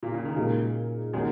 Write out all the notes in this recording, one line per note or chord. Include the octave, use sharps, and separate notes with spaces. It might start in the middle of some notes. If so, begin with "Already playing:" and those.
A#2
C#3
D#3
A#2 C#3 F#3 G#3 D#4 A#4
D#3 F#3 G#3 A#3 C#4 F#4